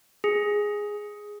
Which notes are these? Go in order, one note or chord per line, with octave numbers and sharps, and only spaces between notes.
G#4